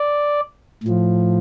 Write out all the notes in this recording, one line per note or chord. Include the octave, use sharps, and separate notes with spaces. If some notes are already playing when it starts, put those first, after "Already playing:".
Already playing: D5
A2 F3